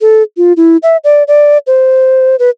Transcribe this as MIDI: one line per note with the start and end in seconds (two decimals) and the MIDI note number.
0.01 0.23 69
0.37 0.53 65
0.57 0.77 64
0.83 0.97 76
1.04 1.23 74
1.28 1.58 74
1.67 2.36 72
2.39 2.50 71